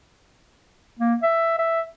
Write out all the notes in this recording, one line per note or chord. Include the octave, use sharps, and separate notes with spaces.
A#3
E5
E5